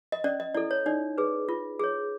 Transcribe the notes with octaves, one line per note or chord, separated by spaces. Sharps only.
D#5
C#4 D5
D#5
E4 A4 D5
C#5
D#4 D5
G#4 B4
F4
G#4 C#5